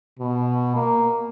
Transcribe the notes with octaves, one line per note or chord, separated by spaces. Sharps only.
B2
A#3